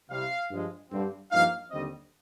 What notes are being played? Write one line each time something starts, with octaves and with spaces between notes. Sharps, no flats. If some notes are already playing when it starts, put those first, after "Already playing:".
C2 C3 G3 F5
G2 F3 G#3
G2 D3 G3 C4
G2 F3 A#3 D#4 F5
D#2 D3 G3 C4 D#5